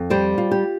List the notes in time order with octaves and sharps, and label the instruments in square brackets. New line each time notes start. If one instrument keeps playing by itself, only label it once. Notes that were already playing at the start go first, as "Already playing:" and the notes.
Already playing: [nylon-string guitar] F2
G3 G4 C5
F4
G4